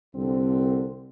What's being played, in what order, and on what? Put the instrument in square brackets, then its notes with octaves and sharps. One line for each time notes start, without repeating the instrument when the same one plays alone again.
[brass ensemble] C2 D3 C4